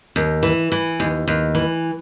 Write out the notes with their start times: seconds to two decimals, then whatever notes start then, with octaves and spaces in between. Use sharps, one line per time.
0.16 D#2
0.43 E3
0.72 E3
1.00 D#2
1.28 D#2
1.55 E3